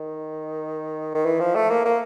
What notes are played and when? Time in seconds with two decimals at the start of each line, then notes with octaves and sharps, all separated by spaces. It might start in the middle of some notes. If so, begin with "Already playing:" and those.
Already playing: D#3
1.15 D#3
1.25 E3
1.40 F3
1.56 A3
1.70 A#3
1.85 A#3